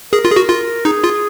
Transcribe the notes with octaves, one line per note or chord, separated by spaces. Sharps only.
G#4 A#4
F4
G#4
F#4
F4
D#4 G#4
F4